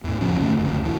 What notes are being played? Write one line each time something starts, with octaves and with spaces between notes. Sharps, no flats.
E2 A2
F1 C#2 F3 C#4
G2 D3 A3
F#1 D2
E1 E3